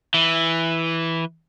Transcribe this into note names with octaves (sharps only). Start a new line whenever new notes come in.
E3